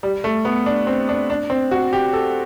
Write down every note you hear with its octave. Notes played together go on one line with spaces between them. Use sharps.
G3
A3
B3
D4
C4
D4
D4
C4
F#4
G4
A4